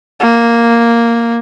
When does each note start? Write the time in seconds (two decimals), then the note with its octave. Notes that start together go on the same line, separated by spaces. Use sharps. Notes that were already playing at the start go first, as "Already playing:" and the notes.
0.20 A#3